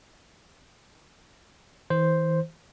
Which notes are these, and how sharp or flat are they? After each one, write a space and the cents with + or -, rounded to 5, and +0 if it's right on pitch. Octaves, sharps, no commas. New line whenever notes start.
E3 -35 C5 +0